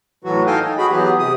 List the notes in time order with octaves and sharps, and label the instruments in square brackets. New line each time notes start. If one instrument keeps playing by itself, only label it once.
[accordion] A2 E3 F#3 F#4
D#4 A4 D#5 F5 G5 G#5
D#4
F#4 G#4 B5
E3 F#3 B3 G4 G#4
C3 D#6